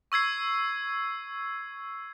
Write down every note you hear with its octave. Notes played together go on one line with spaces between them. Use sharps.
C#6 E6 G#6 C7